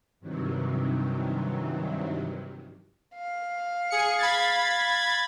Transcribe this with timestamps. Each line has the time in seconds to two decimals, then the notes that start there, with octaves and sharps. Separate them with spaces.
0.20 G2 C3 D#3 E3 F#3
3.15 F5
3.90 G#4 C#7
4.18 B5 G#6 A6